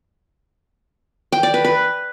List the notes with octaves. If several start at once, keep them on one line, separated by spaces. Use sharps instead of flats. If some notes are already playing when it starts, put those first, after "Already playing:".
G5
D5
B4
B4